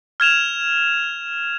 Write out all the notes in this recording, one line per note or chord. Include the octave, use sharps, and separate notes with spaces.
F6 G#6 E7 F7